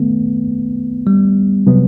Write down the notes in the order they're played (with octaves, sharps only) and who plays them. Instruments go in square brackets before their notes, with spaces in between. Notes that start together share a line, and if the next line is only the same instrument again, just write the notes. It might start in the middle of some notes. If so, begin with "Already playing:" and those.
Already playing: [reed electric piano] D#3 A3 [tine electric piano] B3
[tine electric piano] G3
[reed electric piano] C3 F#3 B3